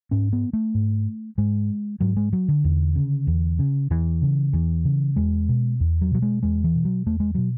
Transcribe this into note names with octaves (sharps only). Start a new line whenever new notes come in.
G#2 C#4
B3
A3
G#2
G#2 G#3
G#2 F#3
G#3
F#3
D3
E2
C#3
E2
C#3
E2 E3
C#3
E2 E3
C#3
E2 G#3
B2
E2
F#3
B2 F#3
G#3
E2 G#3
E3
B2
F#3
E2 A3
G#3
B2 F#3